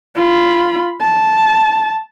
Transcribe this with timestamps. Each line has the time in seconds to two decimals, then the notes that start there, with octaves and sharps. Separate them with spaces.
0.16 F4 B5
1.01 A5